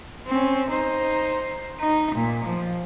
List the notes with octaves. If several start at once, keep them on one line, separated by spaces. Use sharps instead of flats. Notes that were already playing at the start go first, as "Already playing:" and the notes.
C4 C#4
D#4 C5
D#4
A#2
F3